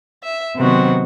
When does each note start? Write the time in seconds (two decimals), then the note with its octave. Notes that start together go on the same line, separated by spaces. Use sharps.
0.23 E5
0.56 C3 D#3 F#3 B3 C4 F#4